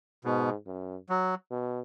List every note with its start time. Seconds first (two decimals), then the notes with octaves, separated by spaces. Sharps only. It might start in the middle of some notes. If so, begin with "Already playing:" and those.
0.24 G#2 B2
0.67 F#2
1.09 F#3
1.51 B2